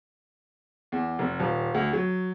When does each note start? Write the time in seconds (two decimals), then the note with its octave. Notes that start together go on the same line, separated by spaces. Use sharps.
0.92 E2
1.19 F1
1.40 D#1
1.75 D2
1.93 F#3